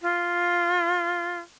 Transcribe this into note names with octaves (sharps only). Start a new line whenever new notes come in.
F4